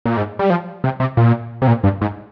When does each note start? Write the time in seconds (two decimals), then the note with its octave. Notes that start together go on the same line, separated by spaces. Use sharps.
0.06 A#2
0.17 G#2
0.39 G3
0.50 F3
0.84 C3
1.00 C3
1.17 A#2
1.62 C3
1.67 A#2
1.84 G2
2.01 G#2